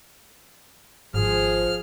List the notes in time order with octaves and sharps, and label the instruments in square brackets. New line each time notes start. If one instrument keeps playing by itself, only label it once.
[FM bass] G#1 [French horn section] F3 [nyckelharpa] G#4 [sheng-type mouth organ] F6